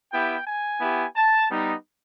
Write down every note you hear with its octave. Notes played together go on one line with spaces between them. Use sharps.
B3 E4 G4 G5
G#5
B3 E4 G4
A5
G3 B3 D#4